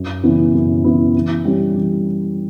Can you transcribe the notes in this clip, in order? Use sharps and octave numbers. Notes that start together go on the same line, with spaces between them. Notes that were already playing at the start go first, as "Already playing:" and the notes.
Already playing: F#2
C#3 E3 B3 E4
F#2
C#3 E3 B3 E4
E3
G3 C#4
E3